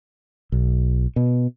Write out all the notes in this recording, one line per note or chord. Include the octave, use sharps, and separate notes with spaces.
B1
B2